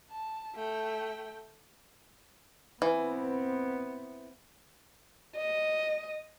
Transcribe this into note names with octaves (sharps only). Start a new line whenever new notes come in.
A5
A3 G5
E3 B3 C4
D#5